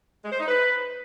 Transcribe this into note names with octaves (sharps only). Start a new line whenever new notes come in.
G#3
C5
D#4
B4